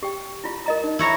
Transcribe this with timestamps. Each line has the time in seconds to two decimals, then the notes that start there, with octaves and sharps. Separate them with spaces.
0.03 G4 G5
0.44 E4 F4
0.66 A#4 D#5 A#5
0.84 D#4
0.99 E4 C#5 A#5